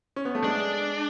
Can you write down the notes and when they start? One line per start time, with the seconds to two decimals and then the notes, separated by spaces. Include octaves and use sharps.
0.16 C#4
0.25 B3
0.35 A3
0.44 G#3 D4